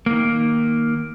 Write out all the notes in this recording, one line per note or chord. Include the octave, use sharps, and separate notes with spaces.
D#3 A#3